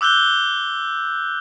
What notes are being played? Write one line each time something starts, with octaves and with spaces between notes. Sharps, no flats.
D6 E6 F#6 G6 G7